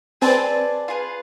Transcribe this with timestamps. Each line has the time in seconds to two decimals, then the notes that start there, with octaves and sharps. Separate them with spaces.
0.21 C4 G#4 B4 D5 A5
0.88 F4 G#4 B4